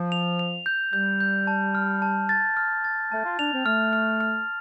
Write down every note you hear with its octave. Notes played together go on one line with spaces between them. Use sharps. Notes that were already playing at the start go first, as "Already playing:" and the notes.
Already playing: F3
F7
F7
G6
G3 G6
G6
A5
F6
A5
A6
F6
A6
A3 A5
F4
D4 F7
C4
A3 F6
F6
F6